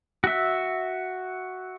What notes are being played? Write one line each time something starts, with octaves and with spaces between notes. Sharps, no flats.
F#4 E5